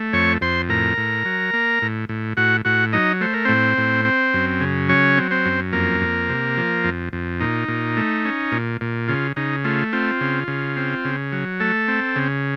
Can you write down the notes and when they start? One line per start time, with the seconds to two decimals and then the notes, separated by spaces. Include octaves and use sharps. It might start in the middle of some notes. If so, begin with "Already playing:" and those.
Already playing: A3
0.13 F2 C#5 C#6
0.41 F2 C5 C6
0.69 A2 A#4 A#5
0.98 A2
1.25 F#3
1.53 A#3
1.82 A2
2.09 A2
2.37 A2 F#4 F#5
2.65 A2 F#4 F#5
2.93 F#3 D#4 D#5
3.21 A3 C5
3.34 A#4
3.45 A2 C4 C5
3.78 A2
4.05 C4
4.34 F#2
4.61 C#3
4.89 F#3 C#4 C#5
5.18 C4
5.31 C4 C5
5.46 F#2
5.72 F2 A#3 A#4
6.01 F2
6.29 C3
6.57 F3
6.84 F2
7.13 F2
7.40 A#2 D#4
7.68 A#2
7.97 A3
8.25 C#4
8.52 A#2
8.81 A#2
9.08 C#3 F4
9.36 C#3 D#4
9.64 A3 F4
9.93 C4 F4
10.21 C#3
10.48 C#3
10.77 C4
11.05 C#3
11.32 F#3
11.60 A3 A4
11.88 C4
12.16 C#3